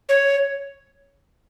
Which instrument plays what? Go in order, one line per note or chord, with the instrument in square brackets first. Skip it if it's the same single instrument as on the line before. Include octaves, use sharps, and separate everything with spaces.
[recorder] C#5